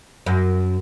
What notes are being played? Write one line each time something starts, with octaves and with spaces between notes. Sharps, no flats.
F#2